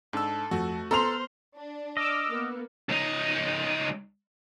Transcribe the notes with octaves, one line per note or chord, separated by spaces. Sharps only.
G#2 D4 A4 E6
F2 A3 F#4
B3 A4 C5 A#5 C6 F6 F7
D4
D#5 D6 E6 F6
A#3 B3
C#2 D#4